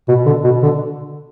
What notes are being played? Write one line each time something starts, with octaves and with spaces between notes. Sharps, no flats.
B2
D3
B2
D3